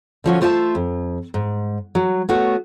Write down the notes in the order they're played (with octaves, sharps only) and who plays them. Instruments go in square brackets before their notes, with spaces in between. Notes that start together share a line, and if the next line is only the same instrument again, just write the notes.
[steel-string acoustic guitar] D3 F3 C#4 F#4
A3 F4 C5 C#5 E5 A5
F2
G#2
F#3
A3 B3 F#4 C#5